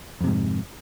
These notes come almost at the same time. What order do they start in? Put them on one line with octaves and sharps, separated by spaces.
F2 C3 G#2